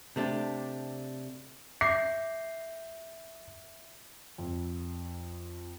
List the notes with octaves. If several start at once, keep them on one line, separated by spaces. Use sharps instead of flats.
C3 A3 D4 G4
E5 D6 G6 A#6 C7
F2